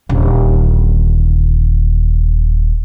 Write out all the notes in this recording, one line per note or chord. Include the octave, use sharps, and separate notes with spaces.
D#1 D3